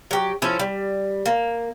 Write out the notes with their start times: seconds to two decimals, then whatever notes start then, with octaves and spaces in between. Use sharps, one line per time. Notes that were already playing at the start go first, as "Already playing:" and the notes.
0.11 F#3 G4
0.42 F3 C#4 E4 A4
0.59 G3
1.26 A#3